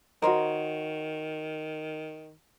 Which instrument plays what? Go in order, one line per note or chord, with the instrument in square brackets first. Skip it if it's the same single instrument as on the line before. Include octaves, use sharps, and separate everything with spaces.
[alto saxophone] D#3 [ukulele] F#4 D#5 [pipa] A#4 C5 C#5